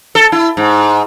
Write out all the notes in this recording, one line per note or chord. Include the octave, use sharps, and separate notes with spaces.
A4
E4
G#2